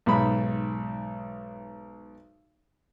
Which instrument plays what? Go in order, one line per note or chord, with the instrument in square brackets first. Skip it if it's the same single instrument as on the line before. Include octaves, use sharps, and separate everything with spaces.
[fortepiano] B1 G#2 B5